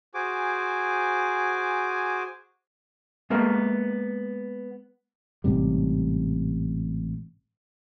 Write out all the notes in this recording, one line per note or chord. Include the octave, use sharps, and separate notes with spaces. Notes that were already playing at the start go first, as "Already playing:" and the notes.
F#4 G#4 C5 G#5 D6
G#3 A#3 B3 A#4 E5
A1 G#2 C3 G3